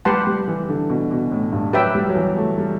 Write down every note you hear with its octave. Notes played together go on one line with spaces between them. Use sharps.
G3 G4 B4 F#5 A5 C6
G3
E3
D3
B2
B2
A2
G2
F#3 G4 B4 E5 G5
G3
F#3
E3
A3
G3